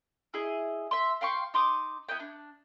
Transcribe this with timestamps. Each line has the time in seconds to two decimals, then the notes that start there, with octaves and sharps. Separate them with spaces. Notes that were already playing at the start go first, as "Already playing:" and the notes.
0.34 E4 G#4 D#5
0.91 E5 C6
1.21 F5 G5 C6 C#6
1.54 D#4 C6 D6 D#6
2.09 B3 E4 D#5 G5
2.20 D4